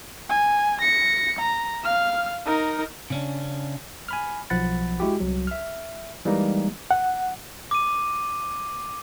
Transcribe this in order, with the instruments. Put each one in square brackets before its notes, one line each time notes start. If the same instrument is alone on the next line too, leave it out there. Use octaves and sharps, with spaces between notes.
[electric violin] G#5
A#6 C#7
A#5
F5 F6
D#4 A#4
[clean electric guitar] C#3 C#4 D4
[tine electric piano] G#5 B5 F6
B1 F3 F#5 B5 A6
G#3 E4 F#4 G4
C2 F#3
E5 F6
E3 G3 G#3 A#3 D#4
[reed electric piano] F#5
[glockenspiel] D6 D#7